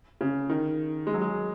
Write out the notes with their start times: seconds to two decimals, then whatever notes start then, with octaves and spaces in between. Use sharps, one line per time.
0.21 C#3
0.49 D#3
1.07 G#3
1.14 F#3
1.22 G#3